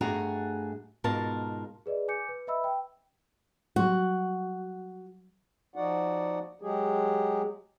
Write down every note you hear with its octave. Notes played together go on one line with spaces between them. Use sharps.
G2 A3 F#4 G#4 F#5 A#5
G#2 B2 F4 A#4 A5
G#4 B4 D5 D#5
G#5 D6 G6 C#7
B4
B4 D#5 E5 B5 E6
G5
F#3 G3 F#4
F3 D#4 F#4 D5 F#5
F#3 G#3 G4 G#4